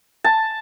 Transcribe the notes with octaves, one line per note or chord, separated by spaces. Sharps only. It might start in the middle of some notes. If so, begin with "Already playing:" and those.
A5